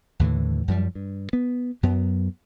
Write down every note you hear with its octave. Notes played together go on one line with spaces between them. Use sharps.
D#2 A2 D3 E3
F#2 F3 G3
G2
B3
F#2 F#3 B3